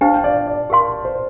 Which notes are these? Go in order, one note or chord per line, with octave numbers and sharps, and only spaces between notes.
D4 G4 C5 F5 A5
G5
D5 F5
D5
G4 A#4 F5 C6
C5